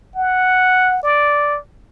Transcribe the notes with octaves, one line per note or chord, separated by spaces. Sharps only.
F#5
D5